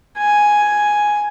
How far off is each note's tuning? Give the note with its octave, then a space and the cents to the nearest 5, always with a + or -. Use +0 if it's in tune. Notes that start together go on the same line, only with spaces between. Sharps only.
G#5 +5